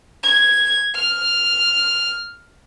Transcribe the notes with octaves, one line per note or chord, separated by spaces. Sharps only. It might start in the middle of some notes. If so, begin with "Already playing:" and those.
G#6
F6